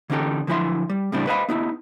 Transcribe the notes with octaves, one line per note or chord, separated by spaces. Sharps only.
D3 E3 C#4 D#4 G4 A4
D3 F3 F#3 E4 E5 C6
G3
A2 C#3 G3 C4 D4 E4
B4 C5 D#5 F5 F#5 B5
B3 D#4 E4